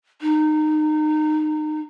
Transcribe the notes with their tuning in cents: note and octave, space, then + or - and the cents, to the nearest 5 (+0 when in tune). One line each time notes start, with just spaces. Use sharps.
D#4 -20